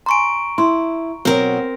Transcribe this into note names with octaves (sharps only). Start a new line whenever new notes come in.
G#5 A#5 C6 C#6 D7
E4 C6
B2 F#3 C4 A#4